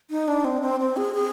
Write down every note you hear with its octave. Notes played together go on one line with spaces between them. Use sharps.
D#4
D4
C4
C4
C4
G#4
G#4